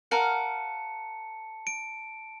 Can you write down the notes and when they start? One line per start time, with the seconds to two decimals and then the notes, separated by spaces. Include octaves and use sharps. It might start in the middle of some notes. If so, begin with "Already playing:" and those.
0.11 A#4 F5 F#5 A5 C#7
1.67 D7